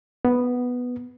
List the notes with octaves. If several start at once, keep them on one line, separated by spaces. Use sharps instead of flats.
B3